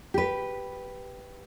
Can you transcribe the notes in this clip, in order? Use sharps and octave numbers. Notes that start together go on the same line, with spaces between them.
G4 B4